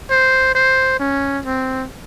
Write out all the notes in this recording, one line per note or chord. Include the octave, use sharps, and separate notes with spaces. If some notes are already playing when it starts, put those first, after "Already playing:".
C5
C5
C#4
C4